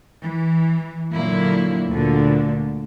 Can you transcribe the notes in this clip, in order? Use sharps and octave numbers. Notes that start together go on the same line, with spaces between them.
E3
A#2 D3 F#3 A#3 E4
D2 A#2 D3